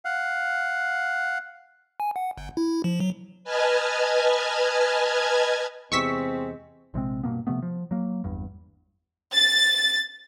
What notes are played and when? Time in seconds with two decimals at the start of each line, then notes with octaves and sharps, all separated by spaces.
0.05 F5 F#5
2.00 G#5
2.16 F#5
2.38 G1
2.57 E4
2.84 F3
3.00 F#3
3.44 B4 D#5 G#5 A5 F6 G#6
5.92 E2 C3 G#3 C4 C#6 E6 B6
6.94 A#1 C3 G#3 C4
7.23 G2 B2 A#3 B3
7.47 C3 F3 A3 B3
7.62 F3
7.91 F#3 A#3
8.24 G1 E2 G2
9.33 A6